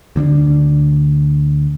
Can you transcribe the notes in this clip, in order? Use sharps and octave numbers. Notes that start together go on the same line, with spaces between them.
D2 D3 C4 D4